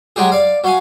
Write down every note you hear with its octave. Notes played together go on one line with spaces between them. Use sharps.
F#3 G#3 G4 G#4
D5 F5
F#3 F5 G#5